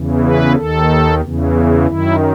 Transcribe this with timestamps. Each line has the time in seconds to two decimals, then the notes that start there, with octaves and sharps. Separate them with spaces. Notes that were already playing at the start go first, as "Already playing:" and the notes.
Already playing: E2 C#3 E3
0.23 B4
0.55 D#2 D#3 A4
1.21 E2 C#3 E3
1.86 F#2 D#3 E4